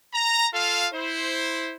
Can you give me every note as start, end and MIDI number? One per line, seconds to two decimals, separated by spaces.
0.14 0.47 82
0.53 0.87 65
0.53 0.87 69
0.53 0.87 77
0.94 1.76 64
0.94 1.76 72